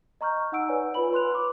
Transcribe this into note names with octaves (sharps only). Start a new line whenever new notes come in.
D#5 A#5 C#6 F6 G6
D#4 F#5 E6 D7
B4 C#5 D5 G#5
F4 B4 G#5 B5 F#7
B4 C6 F#6 F7
B5 D6